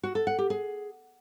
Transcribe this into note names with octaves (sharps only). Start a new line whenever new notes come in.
F#4
A4
F#5
G4
G#4